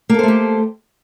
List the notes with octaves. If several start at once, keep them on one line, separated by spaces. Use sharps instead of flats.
A3 A#3 G4 A4 C5